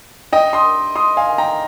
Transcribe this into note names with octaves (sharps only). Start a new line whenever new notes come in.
D#5 G5
C6 D#6
C6 D#6
F5 G#5
G5 A#5